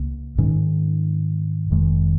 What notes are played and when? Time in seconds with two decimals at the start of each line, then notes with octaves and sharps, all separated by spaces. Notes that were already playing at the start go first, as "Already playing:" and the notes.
Already playing: C#2 C#3 A#3
0.38 G#2 D#3 C#4
1.70 F1 F2 D#3 G#3